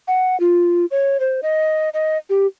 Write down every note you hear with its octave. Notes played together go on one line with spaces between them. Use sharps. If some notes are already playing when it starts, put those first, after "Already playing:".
F#5
F4
C#5
C5
D#5
D#5
G4